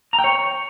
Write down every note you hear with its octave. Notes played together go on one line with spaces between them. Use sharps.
A#5
G5
C#5